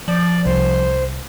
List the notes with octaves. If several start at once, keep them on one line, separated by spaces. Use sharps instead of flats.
F3 D5
C2 C5